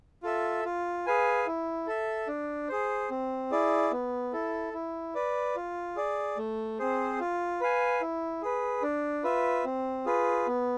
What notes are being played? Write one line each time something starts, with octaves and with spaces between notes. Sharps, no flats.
F4 A4 E5
F4
G#4 B4 F5 G#5
E4
A4 E5
D4
G#4 C5
C4
E4 G#4 D5
B3
E4 A4
E4
B4 D5
F4
G#4 D5
A3
C4 G#4 C5
F4
B4 F5 G#5
E4
G#4 B4
D4
F4 B4 E5
C4
F4 G#4 B4
B3